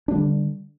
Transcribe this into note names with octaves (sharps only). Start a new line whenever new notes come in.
D3 G3 D4